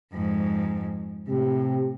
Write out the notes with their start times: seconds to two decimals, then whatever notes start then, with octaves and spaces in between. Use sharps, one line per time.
0.13 F2 G#2
1.28 A2 C3 G4